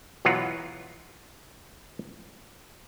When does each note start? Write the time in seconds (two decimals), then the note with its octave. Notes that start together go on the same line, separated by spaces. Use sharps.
0.25 B2 E3 F#3 F4 F#5 A#5